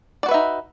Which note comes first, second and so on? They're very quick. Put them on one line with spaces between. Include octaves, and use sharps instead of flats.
D5 F#4 B4 E5 D#4